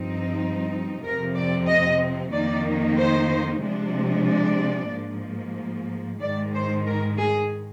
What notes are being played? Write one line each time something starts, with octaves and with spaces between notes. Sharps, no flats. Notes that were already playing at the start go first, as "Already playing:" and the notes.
Already playing: G2 F3 C4 D#4
F2 C3 F3 C4 A#4
D5
D#5
F2 D#3 A#3 D#4 D5
C5
C3 F3 G#3 D4
D5
G#2 F3 A#3
G#2 D#3 G#3 D5
C5
A#4
G#4